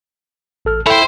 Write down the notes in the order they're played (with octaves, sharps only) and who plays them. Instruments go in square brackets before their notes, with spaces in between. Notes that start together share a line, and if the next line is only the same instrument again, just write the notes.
[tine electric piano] A1 A4 F6
[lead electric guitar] E4 [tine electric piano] A4 G5 [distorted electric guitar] C5 C#5